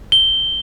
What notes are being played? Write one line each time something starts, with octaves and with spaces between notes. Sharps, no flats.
G7